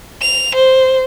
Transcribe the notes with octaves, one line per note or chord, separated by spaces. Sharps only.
F7
C5